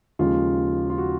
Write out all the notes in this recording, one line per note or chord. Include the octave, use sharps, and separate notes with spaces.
D#2 C#3 F3 G#3 F4
F4
F#4